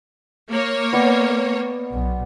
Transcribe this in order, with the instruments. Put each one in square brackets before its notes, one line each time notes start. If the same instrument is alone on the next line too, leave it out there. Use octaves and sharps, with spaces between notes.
[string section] A#3 C#5
[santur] B3 D5 G5
[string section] B1